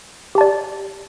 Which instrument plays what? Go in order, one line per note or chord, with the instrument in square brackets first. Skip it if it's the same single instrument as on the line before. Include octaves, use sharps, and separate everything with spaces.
[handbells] G4
A5
D5